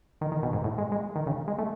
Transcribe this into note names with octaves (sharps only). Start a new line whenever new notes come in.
D#3
D#3
B2
G#2
A2
G#3
G#3
D#3
C#3
G#3
A3